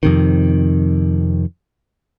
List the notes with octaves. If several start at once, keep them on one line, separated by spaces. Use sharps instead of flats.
F2 C3 D#3